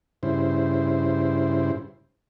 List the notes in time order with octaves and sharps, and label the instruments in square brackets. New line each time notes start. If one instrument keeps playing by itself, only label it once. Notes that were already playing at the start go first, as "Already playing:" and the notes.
[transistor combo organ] G2 C#3 E4 C5